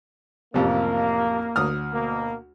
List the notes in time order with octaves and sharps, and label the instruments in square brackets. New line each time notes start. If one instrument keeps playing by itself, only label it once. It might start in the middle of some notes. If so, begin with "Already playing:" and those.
[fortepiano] A1 F2 C3 [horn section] A#3
[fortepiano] D2 D#6 F6
[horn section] B2 A#3